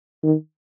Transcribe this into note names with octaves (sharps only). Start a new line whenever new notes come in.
D#3